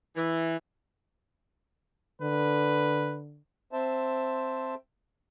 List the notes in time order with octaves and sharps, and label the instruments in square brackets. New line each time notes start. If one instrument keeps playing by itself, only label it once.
[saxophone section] E3
[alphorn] D3 [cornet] B4
[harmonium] C4 C5 E5 A5